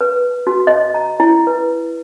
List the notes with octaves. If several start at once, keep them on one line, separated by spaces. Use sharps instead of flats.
B4
F#4
D#5
A#5
E4
B4